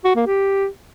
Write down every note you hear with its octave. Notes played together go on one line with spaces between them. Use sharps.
F#4
A#3
G4